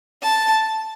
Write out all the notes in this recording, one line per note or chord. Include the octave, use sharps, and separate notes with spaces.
A5